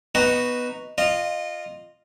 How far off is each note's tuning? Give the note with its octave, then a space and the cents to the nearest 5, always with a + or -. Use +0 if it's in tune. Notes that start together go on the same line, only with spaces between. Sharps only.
B3 -5 D#4 -5 F#4 +0
F4 +0 D#5 -20